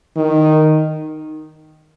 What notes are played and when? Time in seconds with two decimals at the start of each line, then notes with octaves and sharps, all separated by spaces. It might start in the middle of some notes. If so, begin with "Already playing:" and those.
0.17 D#3